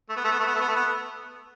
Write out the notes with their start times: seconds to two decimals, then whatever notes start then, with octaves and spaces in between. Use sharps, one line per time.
0.10 A3
0.17 B3
0.24 A3
0.32 B3
0.40 A3
0.47 B3
0.54 A3
0.61 B3
0.68 A3
0.76 B3